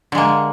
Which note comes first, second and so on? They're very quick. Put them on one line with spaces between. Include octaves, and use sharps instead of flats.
D3 G#3 A#3